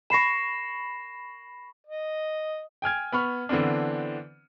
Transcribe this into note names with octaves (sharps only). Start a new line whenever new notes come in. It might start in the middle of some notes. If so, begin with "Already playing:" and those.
B5 C#6 A#6 C7 E7
D#5
G5 G#5 F6 G#6
B3 B5 C#6 F6
D3 E3 B3 C4 D4